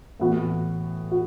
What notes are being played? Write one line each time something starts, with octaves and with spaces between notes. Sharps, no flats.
A2 E3 B3 F#4
F#4